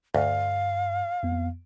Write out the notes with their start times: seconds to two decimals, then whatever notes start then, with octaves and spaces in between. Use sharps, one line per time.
0.15 D2 G2 F5
1.23 F2 B3